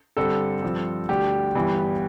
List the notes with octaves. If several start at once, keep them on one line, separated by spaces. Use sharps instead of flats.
G2 D3 G3 C4 A4
G2 F3 C4
D2 D3 G3 G4
G1 G2 E3 G3 B3